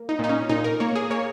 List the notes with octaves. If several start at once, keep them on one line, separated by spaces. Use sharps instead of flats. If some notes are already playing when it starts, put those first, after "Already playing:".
Already playing: A#3
D#4
A#2 D#4
C#4
A#2 D#4
A#4
A#3 C#5
G#4
A#3 C#5